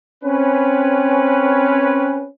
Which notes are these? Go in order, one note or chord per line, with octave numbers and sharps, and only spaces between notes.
C4 C#4 B4